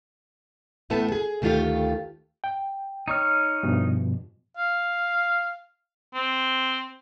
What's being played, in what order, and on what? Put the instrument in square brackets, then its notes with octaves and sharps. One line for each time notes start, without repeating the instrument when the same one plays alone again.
[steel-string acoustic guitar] E2 A2 A3 B3 A5
G#4
D2 D#3 A3 F4 G4 F5
[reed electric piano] G5
[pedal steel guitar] D#4 C#5 F6
[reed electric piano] G2 B2 F3
[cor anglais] F5
C4